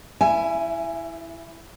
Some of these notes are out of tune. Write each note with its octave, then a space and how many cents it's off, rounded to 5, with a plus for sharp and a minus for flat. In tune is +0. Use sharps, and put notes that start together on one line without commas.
E4 +0 E5 +30 G#5 +0